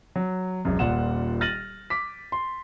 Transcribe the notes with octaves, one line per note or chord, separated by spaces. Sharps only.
F#3
E1 F#2
D#1 A#2 F#5 E7
F6 A6 A#6 D#7 F#7
D6 B6
C6